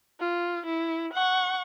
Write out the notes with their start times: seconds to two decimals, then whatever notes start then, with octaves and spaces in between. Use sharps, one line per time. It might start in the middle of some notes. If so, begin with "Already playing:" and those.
0.20 F4
0.66 E4
1.13 F#5 C#6